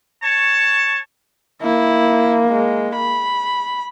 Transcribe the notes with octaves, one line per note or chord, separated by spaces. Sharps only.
C#5 A5 C#6
A#3 E4
G#3
B5